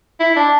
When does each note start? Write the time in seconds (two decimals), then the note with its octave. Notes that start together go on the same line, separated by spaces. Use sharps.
0.20 E4
0.36 D4